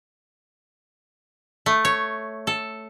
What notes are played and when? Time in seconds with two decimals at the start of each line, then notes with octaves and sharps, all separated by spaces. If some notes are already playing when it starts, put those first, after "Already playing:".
1.66 A3
1.85 C#5
2.47 A4